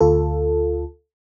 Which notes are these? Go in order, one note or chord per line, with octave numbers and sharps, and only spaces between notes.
D2 F4 A4